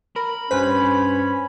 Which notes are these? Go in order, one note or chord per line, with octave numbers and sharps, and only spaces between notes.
A#4 B5
G2 C#4 B4 C5 B6